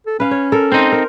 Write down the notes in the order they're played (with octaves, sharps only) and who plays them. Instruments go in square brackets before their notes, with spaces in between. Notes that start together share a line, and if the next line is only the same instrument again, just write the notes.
[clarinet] A4
[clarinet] C#4 [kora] B4 F5
[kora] C#5
A4 A#4
[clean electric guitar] C4 D#4 [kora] C5
[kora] A#4